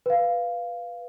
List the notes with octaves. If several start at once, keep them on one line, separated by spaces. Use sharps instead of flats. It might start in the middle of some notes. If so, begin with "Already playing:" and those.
B4 F5